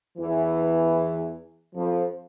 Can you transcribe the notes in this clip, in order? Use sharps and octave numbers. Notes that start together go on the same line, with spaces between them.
E2 E3
F2 F3